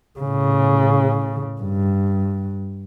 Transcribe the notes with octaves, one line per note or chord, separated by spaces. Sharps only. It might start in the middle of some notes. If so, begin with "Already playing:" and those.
A2 C#3
G2